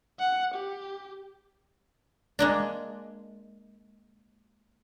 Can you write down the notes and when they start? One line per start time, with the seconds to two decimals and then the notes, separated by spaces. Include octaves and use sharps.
0.19 F#5
0.55 G4
2.39 G#3 A#3 D4